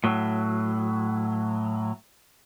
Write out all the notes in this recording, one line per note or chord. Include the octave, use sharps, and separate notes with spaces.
A2 F#3